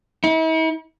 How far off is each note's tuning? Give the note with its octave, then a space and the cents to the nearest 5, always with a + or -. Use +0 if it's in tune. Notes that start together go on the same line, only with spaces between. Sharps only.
E4 -45